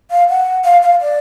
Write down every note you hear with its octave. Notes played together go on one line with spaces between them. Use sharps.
F5
F#5
F5
F5
D5